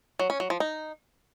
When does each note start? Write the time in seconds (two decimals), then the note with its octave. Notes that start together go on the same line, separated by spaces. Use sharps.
0.19 F#3
0.30 C#4
0.40 F#3
0.50 F3
0.60 D#4